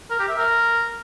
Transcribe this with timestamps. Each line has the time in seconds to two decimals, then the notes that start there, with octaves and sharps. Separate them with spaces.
0.11 A#4
0.20 G4
0.29 E5
0.37 A#4